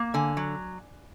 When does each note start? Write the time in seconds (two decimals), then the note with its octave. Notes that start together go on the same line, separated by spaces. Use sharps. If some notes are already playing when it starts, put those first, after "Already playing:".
Already playing: A#3
0.14 D3 G#5
0.37 F#3